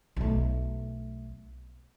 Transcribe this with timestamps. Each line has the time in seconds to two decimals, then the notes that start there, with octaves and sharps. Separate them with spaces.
0.16 B1 A3